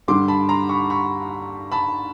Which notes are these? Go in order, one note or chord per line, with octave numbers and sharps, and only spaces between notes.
G2 D3 G3 C6 D6
A5 B5
A#5 C6
B5 C#6
B5 C#6
A5 B5